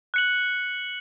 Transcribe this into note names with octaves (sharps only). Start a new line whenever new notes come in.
F#6 C#7 F#7